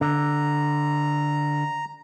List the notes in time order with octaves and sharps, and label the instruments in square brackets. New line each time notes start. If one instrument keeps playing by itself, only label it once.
[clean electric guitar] D3 [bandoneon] A#5